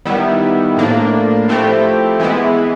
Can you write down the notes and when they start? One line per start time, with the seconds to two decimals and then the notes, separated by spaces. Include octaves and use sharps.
0.05 D#3 G3 B3 E4
0.77 A2 F3 A#3 D4
1.48 F3 A3 C4 E4 G4
2.20 E3 G#3 B3 E4